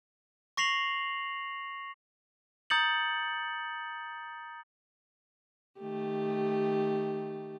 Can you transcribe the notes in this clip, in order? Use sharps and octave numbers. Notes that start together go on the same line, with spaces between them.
C#6 A#6 C7 F7 F#7
A#5 D#6 G6 A6 C#7 F#7
D#3 A3 G4